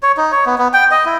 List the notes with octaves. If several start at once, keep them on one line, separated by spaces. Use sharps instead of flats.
C#5
D#4
C#5
B3
B3
G5
D#5
E4